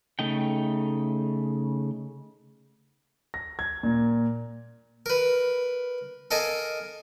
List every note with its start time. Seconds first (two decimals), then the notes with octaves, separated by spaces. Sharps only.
0.19 C#3 A3 D#4 G5
3.34 A#6
3.59 G#6
3.83 A#2
5.06 A#4 B4
6.31 A4 A#4 D#5 F5 G#5